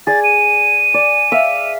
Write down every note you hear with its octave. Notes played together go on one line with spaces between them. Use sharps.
G#4 D5 A6
D#7
D5
E5 F5